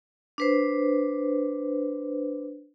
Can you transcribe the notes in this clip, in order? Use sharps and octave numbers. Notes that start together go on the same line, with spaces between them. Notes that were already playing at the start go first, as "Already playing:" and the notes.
D4 B4 C5